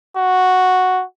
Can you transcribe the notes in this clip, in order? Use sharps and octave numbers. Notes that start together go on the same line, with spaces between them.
F#4